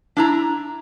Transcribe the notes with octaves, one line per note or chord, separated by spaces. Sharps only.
D4 E4 A#5